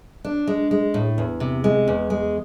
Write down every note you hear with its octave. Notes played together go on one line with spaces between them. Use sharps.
D4
G#3
G#3
A2
E2
C3
G#3
E2
G#3